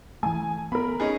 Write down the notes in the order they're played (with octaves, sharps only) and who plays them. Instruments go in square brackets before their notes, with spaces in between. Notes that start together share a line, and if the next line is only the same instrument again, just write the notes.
[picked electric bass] E3 A3 [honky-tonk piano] G#5
[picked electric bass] B3 [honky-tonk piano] A#4 B5
[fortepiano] C#4 D#4 G#4